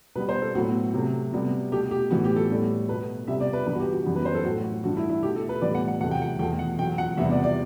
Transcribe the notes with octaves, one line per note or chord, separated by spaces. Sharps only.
B2 G3 B3 B4
C5
A4
A2 F#3 B3 F#4
C3 F#3 A3
C3 G3 B3
B2 A3 G4
G4
A2 E3 B3 F#4
G4
A4
A2 G3 B3
B2 A3 B4
C3 G3 B3 E5
D5
B4
G2 E3 B3 B4
F#4
G4
F#4
F#2 E3 G3 B3
B4
C5
A4
A2 F#3 A3 F#4
F#4
G2 E3 A3 F#4
E4
F#4
E4
B2 A3 G4
A4
B4
A2 E3 G3 B3 D5
F#5
F#5
E2 C3 F#3 A3 F#5
G5
F#5
E2 B2 A3 G5
F#5
E2 B2 F#3 G5
F#5
E2 C3 G3 B3 E5
D5
D5